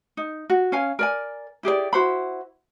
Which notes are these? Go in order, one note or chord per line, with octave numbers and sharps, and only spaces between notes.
D#4
F#4
C#4 F5 G#5
A#4 D5 G#5
E4 G4 G#4 D5
E4 F#4 C5 B5